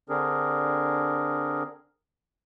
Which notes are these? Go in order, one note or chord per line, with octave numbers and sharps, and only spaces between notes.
D3 C4 D4 G#4 A#4